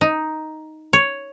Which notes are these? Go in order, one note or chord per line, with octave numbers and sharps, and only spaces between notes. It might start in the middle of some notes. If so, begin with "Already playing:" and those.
D#4
C#5